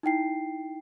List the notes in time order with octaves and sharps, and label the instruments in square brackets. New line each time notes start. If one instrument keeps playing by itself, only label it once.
[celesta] D#4 E4 G5 C7